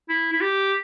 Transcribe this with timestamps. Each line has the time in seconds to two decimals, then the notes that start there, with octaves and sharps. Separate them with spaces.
0.09 E4
0.33 E4
0.41 G4